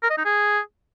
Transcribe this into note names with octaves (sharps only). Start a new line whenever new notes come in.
A#4
D#5
D#4
G#4